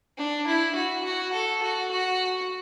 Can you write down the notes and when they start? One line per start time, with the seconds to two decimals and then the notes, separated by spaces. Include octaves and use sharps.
0.17 D4
0.47 E4
0.75 F#4
1.04 F#4
1.33 A4
1.63 F#4
1.91 F#4